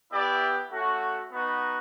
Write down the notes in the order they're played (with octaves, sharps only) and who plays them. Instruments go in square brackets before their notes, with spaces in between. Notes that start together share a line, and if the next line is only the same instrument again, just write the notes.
[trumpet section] B3 E4 G4 D5 E5
A3 C#4 F#4
B3 D#4 F#4